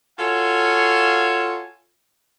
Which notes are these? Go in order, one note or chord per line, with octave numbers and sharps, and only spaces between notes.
F4 F#4 A4 C#5 F5 G#5